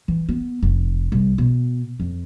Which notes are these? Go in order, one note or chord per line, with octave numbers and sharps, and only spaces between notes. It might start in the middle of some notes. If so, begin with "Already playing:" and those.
E3
B3
F1
C2
B2
F2